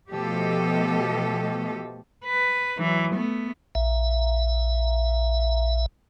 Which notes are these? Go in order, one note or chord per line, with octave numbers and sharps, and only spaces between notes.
B2 F3 A3 G4 A4 D#5
B4
E3 F#3
A3 B3
A#1 E5